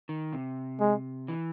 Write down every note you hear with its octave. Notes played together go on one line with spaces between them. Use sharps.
D#3
C3
G#3
E3